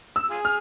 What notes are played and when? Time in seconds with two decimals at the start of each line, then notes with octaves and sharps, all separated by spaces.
0.16 E6
0.30 F4 G#4
0.45 F6